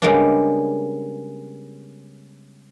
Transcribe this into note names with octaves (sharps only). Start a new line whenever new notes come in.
C#3 G3 G#3 A#3 B3 D4